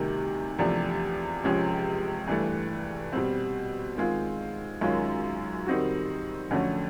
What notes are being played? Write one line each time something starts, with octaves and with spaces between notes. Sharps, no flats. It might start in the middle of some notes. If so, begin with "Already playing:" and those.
Already playing: D2 C3 D#3 G3
E2 C3 F3 A3 D4
C#2 C3 F3 G#3 C#4
G2 E3 A3
B2 G3 C4
D#3 G#3 C4 F4
F#2 D#3 G#3 C#4 F4
D#3 G3 C4 D#4 F#4
F2 D3 F#3 A3 C#4